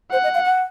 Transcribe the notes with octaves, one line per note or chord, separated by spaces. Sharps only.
C5 F#5
D#5
F5
F#5